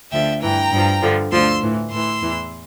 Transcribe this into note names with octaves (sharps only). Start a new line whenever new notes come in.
D2 D3 F3 E5 G5
G2 E3 G5 A#5
G2 F3
G2 D3 F3
D2 D3 F3 C6 E6
A2 E3
A2 E3 C6 E6
E2 E3